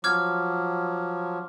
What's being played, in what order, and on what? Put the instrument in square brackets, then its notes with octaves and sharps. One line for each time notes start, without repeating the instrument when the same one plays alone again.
[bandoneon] F3 F#3 [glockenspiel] D6 F6 G#6